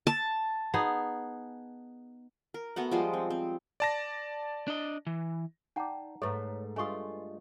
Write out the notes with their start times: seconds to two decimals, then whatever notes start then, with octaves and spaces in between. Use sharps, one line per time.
0.07 A5
0.74 B3 D#4 G#4
2.54 A#4
2.76 A3 B3 F#4 F#5
2.92 F3 G3 G#3 C5
3.13 C4
3.30 C4
3.80 D5 A5 A#6
4.68 D4 D#5
5.07 E3
5.76 D#4 D5 F#5 G5 A#5
6.22 G#2 A3 A4 B4 C#5 A#5
6.76 G2 G#3 A3 F4 G#5 C#6 D#6